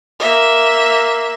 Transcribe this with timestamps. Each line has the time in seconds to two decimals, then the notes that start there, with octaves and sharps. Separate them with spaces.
0.20 A#3 E5